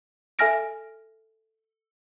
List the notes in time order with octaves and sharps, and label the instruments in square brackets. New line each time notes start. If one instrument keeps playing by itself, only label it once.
[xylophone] A4 E5 G#5 F6 A#6 D7